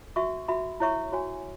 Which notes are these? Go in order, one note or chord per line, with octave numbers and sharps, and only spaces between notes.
F#4 E5 C#6
F#4 E5 B5
E4 C#5 E5 C#6
F#4 C#5 G#5